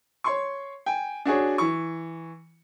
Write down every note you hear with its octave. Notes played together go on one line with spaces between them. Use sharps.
C#5 C6 C#6
G5 G#5
D4 F#4 G#4 C#5
E3 C#6